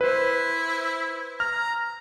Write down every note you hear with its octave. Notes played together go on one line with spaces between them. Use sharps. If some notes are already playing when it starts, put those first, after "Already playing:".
E4 B4 C5
A#5 F6